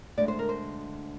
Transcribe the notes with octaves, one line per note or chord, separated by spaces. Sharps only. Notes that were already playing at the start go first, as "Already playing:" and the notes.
D2 D3 G#3 D5
C5
A#4
C5